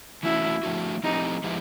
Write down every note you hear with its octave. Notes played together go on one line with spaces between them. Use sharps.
E3 A3 C#4 E4 F#4
F3 A3 D4 F#4
F3 A3 C4 D#4 E4 G4
F3 G#3 B3 E4 G4